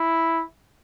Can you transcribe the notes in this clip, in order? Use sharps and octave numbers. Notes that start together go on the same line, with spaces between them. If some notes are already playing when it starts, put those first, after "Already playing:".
Already playing: E4